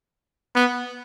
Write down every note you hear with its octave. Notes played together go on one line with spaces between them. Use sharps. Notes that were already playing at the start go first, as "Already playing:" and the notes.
B3